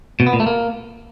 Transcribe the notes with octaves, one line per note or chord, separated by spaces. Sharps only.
B2
B3
A#2
A3
A#3